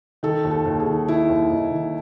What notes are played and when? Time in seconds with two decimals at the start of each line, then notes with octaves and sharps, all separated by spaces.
0.23 D#3 A4
0.44 D#2
0.51 A4
0.65 D#2
0.80 G#4
0.86 D#3
1.08 D#3 E4
1.30 D#2
1.50 D#2 D#4
1.71 D#3